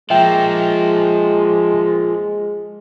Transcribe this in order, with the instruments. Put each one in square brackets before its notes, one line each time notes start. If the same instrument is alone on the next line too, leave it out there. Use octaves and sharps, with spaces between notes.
[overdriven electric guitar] F3 A#3 [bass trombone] G#3 [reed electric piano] E5 G5